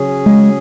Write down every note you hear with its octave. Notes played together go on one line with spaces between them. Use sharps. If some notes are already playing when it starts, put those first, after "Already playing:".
Already playing: C#3 F#3 C#4 G#4
G#3